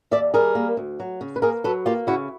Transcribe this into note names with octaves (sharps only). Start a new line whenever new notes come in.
D#2 D5 E5
G3 G#4 A#4
A#3
D2
F#3
C#3
B4
A#3 G#4 A#4
F#3 A4 B4
A#3 F4 G4
C#3 E4 F#4